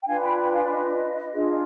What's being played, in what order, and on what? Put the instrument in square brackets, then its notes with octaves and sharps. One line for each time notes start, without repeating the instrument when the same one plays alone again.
[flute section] G5
D4 F4 B4 F5 G#5
G5 B5
G5 B5
F5 G#5
D5
D#5
D4 F4 G#4